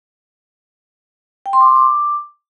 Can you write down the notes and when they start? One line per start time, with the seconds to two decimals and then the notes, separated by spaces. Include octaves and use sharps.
1.46 G5
1.53 C6
1.61 D6
1.68 C6
1.76 D6